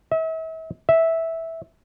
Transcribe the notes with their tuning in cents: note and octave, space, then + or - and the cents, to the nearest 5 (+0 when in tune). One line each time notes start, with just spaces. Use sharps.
E5 -40
E5 -10